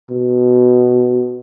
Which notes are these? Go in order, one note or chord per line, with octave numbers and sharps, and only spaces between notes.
B2